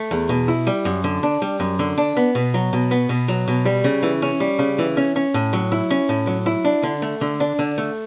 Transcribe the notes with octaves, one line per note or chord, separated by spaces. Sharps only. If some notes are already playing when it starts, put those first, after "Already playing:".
Already playing: A3
E2
B2
E4
G3
F#2
D3
D4
G3
F#2
D3
D4
B3
B2
F#3
B2
B3
B2
F#3
B2
G3
C#3
E3
C#4
G3
C#3
E3
C#4
C#4
A2
F#3
E4
C#4
A2
F#3
E4
D4
D3
A3
D3
D4
D3
A3